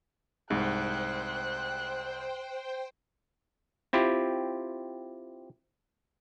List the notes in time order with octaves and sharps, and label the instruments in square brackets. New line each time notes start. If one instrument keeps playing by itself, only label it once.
[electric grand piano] C2 [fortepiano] G#2 [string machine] C5 G5 [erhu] F#6
[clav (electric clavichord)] C4 E4 F4 G4